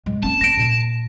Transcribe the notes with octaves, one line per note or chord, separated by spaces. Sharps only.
A2 G#3
A#3 C#4 A5
A3 A#6 D7
A#2